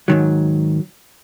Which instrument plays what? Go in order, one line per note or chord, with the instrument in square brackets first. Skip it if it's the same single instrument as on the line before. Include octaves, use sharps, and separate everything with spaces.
[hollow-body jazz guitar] G#2 D#3 F#3